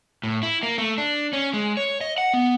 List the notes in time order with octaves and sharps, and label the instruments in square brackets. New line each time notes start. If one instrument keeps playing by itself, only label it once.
[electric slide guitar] A2
E4
A#3
A3
D4
C#4
G#3
C#5
D#5
F#5
B3